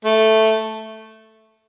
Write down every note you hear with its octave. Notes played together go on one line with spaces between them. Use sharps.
A3